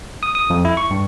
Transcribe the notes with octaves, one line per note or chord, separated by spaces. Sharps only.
D#6
D#6
F2
E4
C#6
G2